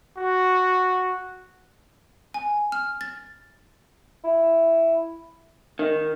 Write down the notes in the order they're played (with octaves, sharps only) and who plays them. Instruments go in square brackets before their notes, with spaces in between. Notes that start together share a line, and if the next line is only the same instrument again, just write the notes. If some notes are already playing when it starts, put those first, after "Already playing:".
[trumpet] F#4
[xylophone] G#5
F6
A6
[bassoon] E4
[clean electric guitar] D#3